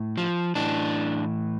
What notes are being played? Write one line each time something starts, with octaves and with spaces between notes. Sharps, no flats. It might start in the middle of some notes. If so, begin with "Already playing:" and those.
Already playing: A2
F3
A2 E3 D4